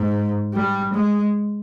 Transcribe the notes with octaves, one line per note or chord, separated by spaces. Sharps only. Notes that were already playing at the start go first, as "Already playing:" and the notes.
Already playing: G#2
G3
G#3